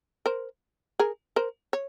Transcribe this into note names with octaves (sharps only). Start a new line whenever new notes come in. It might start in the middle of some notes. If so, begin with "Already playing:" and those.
A#4 C5
G#4 A#4
A#4 C5
C#5